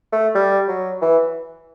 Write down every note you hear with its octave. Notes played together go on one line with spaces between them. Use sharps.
A3
G3
F#3
E3